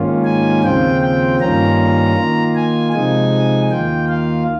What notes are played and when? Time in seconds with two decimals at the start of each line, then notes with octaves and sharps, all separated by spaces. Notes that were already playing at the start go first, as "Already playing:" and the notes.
Already playing: G#2 D#3 A#3 C#4 F4
0.25 G#5
0.64 D#2 C#3 F3 C4 F4 G5
1.01 G5
1.40 G2 D#3 A#3 C#4 F4 A#5
2.16 D#3 A#3 F4
2.55 G#5
2.93 C3 F3 G#3 D#4 G#5
3.70 D#2 D#3 A#3 F4 G5
4.08 F5